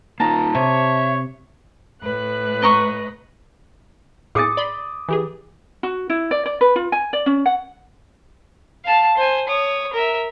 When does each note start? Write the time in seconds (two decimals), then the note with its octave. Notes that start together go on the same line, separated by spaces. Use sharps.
0.20 A#3 D#4 F4 A5 A#5
0.55 C3 C#5 E5
2.02 A2 B4 F#6
2.62 D#5 A#5 C#6
4.35 A2 G#4 D6 D#6 A6 C#7
4.57 D5 B5 C6
5.09 E3 G4 G#4
5.83 F#4
6.10 E4
6.31 D5
6.46 D5
6.61 B4
6.76 F4
6.92 G#5
7.13 D5
7.26 C#4
7.46 F#5
8.85 F5 A5
9.17 C5 G#5
9.48 C#5 D#6
9.93 A#4 E5